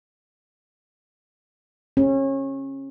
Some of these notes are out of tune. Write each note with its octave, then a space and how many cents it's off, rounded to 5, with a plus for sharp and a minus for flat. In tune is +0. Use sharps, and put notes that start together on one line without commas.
C#4 -30